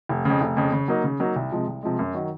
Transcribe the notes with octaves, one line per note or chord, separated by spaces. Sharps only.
F1
F2 C#3
F1
F2 C#3
C#3
F#3 A#3 D#4
C#3
F#3 A#3 D#4
C2
C3 F3 G#3
C2
C3 F3 G#3
F#2
D#3 F#3